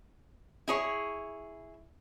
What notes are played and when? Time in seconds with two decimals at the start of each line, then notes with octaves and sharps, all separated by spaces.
0.68 E4 G#4 C#5